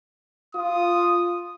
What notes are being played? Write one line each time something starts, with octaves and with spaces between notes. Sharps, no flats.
F4 D#6